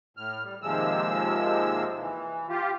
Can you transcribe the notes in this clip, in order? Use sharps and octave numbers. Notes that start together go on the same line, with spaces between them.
A2 F6
G3
D#2 C3 F3 G#3 E6
E3
F4 G4